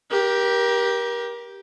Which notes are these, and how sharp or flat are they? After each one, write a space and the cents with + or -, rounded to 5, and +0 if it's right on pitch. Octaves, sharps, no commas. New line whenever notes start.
G4 +0 A#4 +30